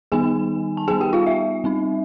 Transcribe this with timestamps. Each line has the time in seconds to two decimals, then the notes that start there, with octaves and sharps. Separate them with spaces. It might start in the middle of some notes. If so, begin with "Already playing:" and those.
0.12 D#3 G3 B3 D#4 G#4 G#5
0.77 A5
0.87 G3 B3 D#4 G#4 G#5
1.01 G4 G5
1.13 F4 F5
1.27 E5
1.64 G3 C4 D#4